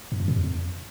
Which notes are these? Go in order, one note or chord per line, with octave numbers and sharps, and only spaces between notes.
G2
F#2
C3
F2